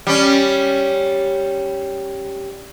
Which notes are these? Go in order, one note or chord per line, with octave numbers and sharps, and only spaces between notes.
G3 C#4